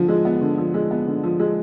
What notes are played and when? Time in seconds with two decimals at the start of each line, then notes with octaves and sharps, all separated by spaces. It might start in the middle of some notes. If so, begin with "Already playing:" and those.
Already playing: D3 F3
0.09 G#3
0.25 B3
0.41 D3
0.58 F3
0.74 G#3
0.91 B3
1.07 D3
1.23 F3
1.40 G#3